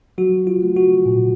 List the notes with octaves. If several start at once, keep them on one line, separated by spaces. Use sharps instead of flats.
F#3 F#4
F4
A3
F#4
A#2